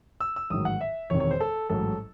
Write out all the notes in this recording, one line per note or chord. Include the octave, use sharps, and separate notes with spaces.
E6
E6
A1 G#2 D#3 F#3 D#6
F#5
E5
E1 E2 C3 D#3 C#5
C#5
C5
A4
A1 G#2 F#3 A4